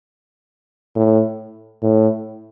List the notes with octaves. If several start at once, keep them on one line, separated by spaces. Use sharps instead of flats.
A2
A2